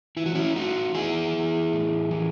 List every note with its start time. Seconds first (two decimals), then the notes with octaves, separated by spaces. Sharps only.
0.17 E3 E4
0.26 F#4
0.35 C#4 E4
0.55 A2 D#4 F#4
0.95 E3 E4 G#4
1.34 E3
1.72 A2
2.11 E3